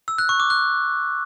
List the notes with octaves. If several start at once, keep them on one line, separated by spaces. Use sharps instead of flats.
E6
F#6
C#6
D6
F#6